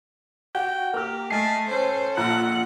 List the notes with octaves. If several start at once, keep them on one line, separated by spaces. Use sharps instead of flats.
F#4 G5
A#3 G4 A#4 F6
A3 D#5 G#5 A5 C7
C#4 A4 C5
A#1 F4 F#5 A#5 F#6